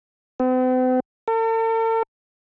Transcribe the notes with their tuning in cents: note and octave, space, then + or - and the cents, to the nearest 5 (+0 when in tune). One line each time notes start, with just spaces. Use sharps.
C4 -45
A4 +45